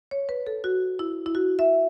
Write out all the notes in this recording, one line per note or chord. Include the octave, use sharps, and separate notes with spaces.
C#5
B4
A4
F#4
E4
E4
F#4
E5